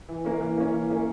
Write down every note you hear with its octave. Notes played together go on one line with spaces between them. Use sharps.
E3
A#3 C#4
E3
A#3 C#4
E3
A#3 C#4